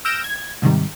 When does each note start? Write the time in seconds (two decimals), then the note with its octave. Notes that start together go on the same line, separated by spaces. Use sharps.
0.05 E6 F6 G6 A#6 D7 E7
0.24 G#6
0.62 G#2 C3 D#3 G3